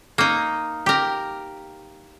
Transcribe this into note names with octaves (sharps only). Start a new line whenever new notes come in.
A#3 D#4
G4 A#4